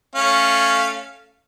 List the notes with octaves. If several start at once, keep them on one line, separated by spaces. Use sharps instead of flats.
A3 C#4 F5